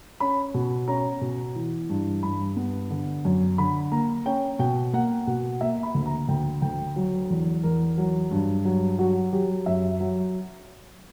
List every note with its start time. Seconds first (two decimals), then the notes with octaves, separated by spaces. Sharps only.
0.20 C#4 B5
0.54 B2
0.88 C#4 A#5
1.21 B2
1.56 E3
1.89 G2
2.23 G2 B5
2.57 B3
2.90 D3
3.25 F#2
3.58 D3 B5
3.92 A#3 A#5
4.26 C#4 G5
4.59 B2 G5
4.93 A#3 F#5
5.27 B2 F#5
5.61 A#3 E5
5.83 B5
5.95 D2
6.06 A#5
6.29 D2 G5
6.62 D2 G5
6.96 F#3
7.30 E2
7.63 E2 A#4
7.98 F#3
8.31 G2
8.65 F#3
8.99 F#3 F#4
9.33 F#3 G4
9.66 F#2 E5
10.00 F#3